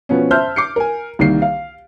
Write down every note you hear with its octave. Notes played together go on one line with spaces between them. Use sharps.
B2 F3 B3 C#4
C5 E5 A5 C6 F6 G6
D6 C7 C#7
A#4 G#5
C2 D#3 A#3 C7
F5